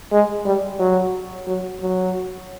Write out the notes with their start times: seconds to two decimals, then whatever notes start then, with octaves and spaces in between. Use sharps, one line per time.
0.12 G#3
0.46 G3
0.79 F#3
1.47 F#3
1.80 F#3